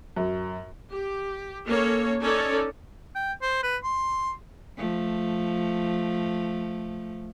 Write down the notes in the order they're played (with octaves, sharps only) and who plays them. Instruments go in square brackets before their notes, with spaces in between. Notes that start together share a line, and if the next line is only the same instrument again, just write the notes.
[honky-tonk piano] F#2
[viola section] G4
A#3 C#4 A4 C#5
C#4 D#4 A4 C#5 D5
[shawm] G5
C5
B4
C6
[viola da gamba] F3 A3